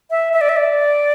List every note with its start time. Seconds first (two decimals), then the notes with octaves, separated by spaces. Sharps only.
0.11 E5
0.33 E5
0.41 D5
0.49 E5
0.56 D5